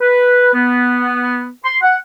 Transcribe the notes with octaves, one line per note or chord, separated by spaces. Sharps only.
B4
B3
C6
F#5